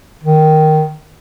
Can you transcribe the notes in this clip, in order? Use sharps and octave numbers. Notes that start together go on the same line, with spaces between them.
D#3